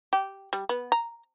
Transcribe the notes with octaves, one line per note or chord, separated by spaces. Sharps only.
G4
G3
B3
A#5